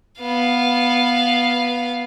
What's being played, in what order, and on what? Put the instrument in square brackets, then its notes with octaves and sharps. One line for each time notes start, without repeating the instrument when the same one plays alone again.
[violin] B3 F5